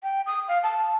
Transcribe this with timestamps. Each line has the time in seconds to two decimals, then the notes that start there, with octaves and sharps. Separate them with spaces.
0.03 G5
0.26 D#6
0.48 F5
0.63 A5